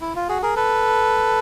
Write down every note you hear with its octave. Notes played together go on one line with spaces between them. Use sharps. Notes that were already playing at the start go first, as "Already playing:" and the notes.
E4
F4
F#4 G#4
G#4 A#4
A4 B4